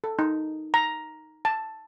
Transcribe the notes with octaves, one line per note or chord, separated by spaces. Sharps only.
A4
D#4
A#5
A5